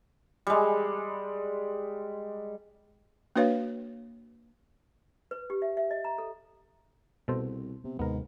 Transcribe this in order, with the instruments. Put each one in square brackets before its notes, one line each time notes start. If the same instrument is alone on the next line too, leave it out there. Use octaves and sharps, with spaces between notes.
[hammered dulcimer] G3 G#3
[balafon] A#3 D4 F#4 B4 C#5 F5
[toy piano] B4
G4
E5
E5
D#5
A#5
A4
[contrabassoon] C2 [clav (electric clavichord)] B2 A4 C5
[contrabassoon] C3 [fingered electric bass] B3
[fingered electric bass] D#2 C3 [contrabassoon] G#2 [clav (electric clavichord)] B3 A#4